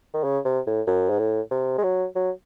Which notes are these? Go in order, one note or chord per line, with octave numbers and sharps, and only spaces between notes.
D#3
C#3
C3
A2
F#2
G#2
A2
C3
G#3
F#3
F#3